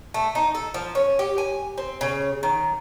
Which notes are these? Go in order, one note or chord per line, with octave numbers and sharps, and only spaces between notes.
A3
D#4
A4
F3
C#4
G4
G#5
C4
C#3
D#3